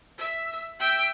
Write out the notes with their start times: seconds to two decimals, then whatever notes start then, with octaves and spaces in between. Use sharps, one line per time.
0.18 E5
0.79 E5 G5